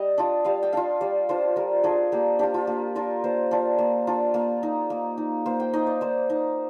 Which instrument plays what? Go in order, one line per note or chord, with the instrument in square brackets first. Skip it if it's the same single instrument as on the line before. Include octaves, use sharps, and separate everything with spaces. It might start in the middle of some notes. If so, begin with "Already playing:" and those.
Already playing: [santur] G3 D#5
D4 F4
G3 F5
G5
D4 F4 F5
G3 D5
D4 F4 C5
G3 A#4
D4 F4 G#4
A#3 G4
D4 F4 G4
F4
A#3
D4 F4 A#4
A#3 C5
D4 F4
A#3
D4 F4
A#3
D#4
A#3
D#4
A#3 C5
G5
D#4 D#5
D5
A#3 C5
D#4